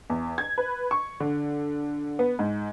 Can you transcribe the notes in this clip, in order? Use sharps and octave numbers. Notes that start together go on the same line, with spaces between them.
E2
G#6
B4
C#6
D3
B3
G#2